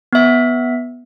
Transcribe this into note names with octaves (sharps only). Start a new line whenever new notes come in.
B3 E5